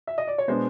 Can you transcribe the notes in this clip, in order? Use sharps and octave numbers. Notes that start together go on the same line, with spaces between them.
E5
D#5
D5
C#5
B2 G#3 B3 D4 C5